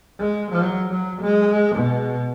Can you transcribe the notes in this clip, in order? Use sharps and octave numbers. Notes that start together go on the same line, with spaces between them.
G#3
F#3
F#3
G#3
B2